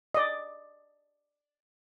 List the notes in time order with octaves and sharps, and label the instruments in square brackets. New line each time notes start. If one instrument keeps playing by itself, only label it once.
[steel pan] D5 D#5